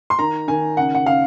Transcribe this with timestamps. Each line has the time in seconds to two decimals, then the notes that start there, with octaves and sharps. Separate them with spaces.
0.10 C6
0.19 D#3 A#5
0.48 D#3 G#5
0.77 C#3 F#5
0.95 F#5
1.06 C#3 F5